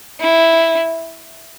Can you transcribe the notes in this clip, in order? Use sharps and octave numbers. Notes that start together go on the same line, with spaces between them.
E4